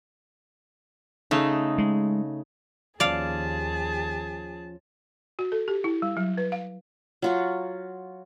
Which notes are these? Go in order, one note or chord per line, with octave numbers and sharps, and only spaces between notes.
C#3 A3 D#4
G#3
D#2 F3 C#4 G#4 D5 F5 A5
F#4
A4
G4
E4
G3
F#3
B4
F5
F#3 F4 F#4